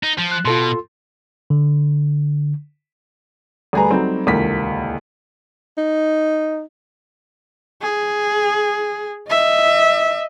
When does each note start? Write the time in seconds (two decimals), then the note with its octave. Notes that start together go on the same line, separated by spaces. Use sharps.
0.03 D#4
0.18 F3
0.31 F#6
0.45 B2 F4 A4 C6
1.50 D3
3.73 D2 G3 G#4 B4 A#5
3.90 F#3 G3 A3 C4 D#4
4.27 D#1 C#2 D3 E3 A#3 B6
5.78 D#4
7.82 G#4
9.29 D#5 E5